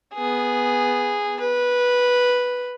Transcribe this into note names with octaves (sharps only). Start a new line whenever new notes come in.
B3 G#4
B4